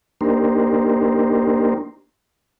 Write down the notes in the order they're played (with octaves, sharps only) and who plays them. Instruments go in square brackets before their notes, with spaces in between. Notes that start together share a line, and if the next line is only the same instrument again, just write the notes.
[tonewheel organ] A#3 D4 D#4 G4 A#4 C5